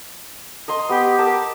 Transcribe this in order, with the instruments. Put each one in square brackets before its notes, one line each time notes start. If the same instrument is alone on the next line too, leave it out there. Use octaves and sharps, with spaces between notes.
[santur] D#5 A#5 C6
[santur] B3 [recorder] G4
[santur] A#4 A5